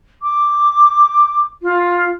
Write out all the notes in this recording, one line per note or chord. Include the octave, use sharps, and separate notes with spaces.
D6
F4